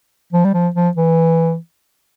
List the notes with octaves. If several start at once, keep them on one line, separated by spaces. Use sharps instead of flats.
F3
G3
F3
F3
E3